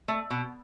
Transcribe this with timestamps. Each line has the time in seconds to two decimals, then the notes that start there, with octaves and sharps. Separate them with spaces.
0.08 A3
0.30 B2